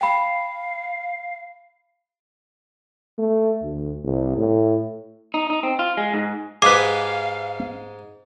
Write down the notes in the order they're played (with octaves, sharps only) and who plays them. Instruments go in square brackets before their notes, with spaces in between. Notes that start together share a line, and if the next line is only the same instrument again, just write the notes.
[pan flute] F5 [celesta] G5 B5
[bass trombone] A3
D2
C2
A2
[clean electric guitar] D#4
D#4
C4
F4
G#3
G#2
[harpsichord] G#2 G#3 G4 [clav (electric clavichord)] G#4 B4 [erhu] F5 [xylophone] D6